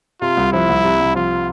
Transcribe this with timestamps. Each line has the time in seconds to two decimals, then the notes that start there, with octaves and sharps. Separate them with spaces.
0.21 C3 F4
0.37 C2
0.53 F3 E4
0.69 C2
0.84 C3
0.99 C2
1.15 F3 F4